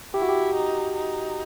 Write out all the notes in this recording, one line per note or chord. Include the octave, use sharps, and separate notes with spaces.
E4 G4
F#4
G4
D#4
D#4